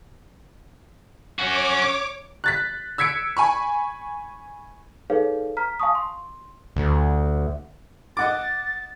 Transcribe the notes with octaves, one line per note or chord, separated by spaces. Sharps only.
C#4 F#4 C#5 D6
F#6 A6 B6
E6 G#6 B6 C#7 D7
G#5 B5 C#6
D#4 G#4 A4 B4 C#5 F5
A#5 F6 B6
F5 G#5 A5 C#6 D#6
C6
D2
D#5 F#5 D6 A6